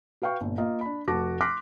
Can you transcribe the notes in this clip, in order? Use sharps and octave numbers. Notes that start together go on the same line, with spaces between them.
F#4 B4 F5 G5 C#6
G1 A#2
A#3 F4 D#5
D4 B5
F1 A3 F#4 A5 D6 A#6
C6 D6 F6 F#6 A#6 B6